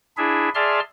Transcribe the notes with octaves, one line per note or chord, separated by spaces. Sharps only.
D4 E4 G#4 E5
G#4 D5 E5 A5 C6 F6